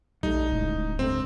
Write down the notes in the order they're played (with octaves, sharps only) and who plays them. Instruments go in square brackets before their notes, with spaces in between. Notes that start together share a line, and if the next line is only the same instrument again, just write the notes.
[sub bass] A#1 [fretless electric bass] G3 A3 [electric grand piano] D#4
[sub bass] D1 [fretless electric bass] C#2 A2
[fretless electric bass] C#2 G2 A3 [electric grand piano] C4